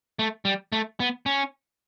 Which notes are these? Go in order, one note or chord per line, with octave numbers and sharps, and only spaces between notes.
A3
G3
A3
B3
C#4